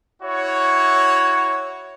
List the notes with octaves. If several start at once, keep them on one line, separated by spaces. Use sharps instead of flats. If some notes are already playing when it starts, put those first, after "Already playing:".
E4 F#4 C#5